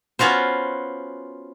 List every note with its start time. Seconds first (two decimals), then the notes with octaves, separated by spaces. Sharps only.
0.19 B3 C#4 F4 F#4 C5